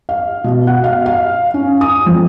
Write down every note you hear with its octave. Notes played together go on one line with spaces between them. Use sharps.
F5
B2
F#5
F5
F5
C#4
D#6
F2